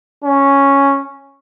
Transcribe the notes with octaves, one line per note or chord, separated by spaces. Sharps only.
C#4